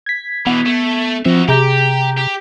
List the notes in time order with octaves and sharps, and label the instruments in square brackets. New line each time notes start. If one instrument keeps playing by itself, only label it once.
[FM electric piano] G#6 B6
[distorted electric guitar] B2 E3 [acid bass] B3
[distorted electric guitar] A3
[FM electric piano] F3 C4 [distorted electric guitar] F#4 E5
[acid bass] C3 [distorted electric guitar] G4 [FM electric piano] G#4 A#5 G6
[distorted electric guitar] G4